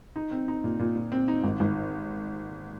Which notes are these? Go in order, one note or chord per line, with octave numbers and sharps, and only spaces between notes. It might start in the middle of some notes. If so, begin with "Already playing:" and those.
D#4
C4
D#4
A#2
A#2
A#2
C4
D#4
G#1
G#1